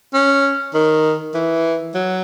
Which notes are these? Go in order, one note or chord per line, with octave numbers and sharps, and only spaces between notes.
C#4
D#3
E3
F#3